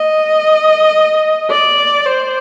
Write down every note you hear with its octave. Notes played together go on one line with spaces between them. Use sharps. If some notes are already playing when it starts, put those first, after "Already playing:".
Already playing: D#5
D5
C5